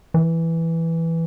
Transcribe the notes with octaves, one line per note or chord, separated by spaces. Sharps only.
E3